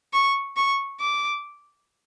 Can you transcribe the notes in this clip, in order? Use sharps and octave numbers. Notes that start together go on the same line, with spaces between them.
C#6
C#6
D6